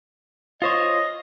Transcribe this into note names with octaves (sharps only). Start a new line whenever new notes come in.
F4 C5 C#5 D#5